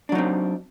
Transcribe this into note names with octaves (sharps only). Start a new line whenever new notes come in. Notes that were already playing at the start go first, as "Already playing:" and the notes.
F#3 C4 D4 D#4